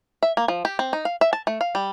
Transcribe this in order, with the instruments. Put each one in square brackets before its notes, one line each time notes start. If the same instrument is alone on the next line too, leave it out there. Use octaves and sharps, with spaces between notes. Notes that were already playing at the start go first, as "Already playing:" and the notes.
[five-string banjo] E5
A#3
F3
G4
C4
D#4
F5
E5
A5
A3
F5
G3